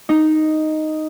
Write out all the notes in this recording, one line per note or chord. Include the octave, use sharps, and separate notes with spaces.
D#4